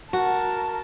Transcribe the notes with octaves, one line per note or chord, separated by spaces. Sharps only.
F#4 A#4 A5